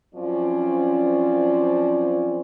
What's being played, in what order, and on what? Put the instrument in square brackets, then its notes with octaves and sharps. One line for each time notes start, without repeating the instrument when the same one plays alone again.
[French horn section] F#2 F3 C4 C#4 D5